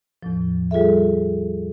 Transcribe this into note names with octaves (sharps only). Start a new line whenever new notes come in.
E2 A2 F3
G3 F4 G#4 A4 E5